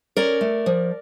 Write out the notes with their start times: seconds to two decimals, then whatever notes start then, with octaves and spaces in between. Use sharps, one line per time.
0.17 C#4 A#4 D5
0.41 A3
0.66 F3